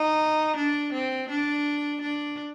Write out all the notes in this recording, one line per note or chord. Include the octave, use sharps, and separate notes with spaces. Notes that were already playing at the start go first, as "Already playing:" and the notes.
Already playing: D#4
D4
C4
D4
D4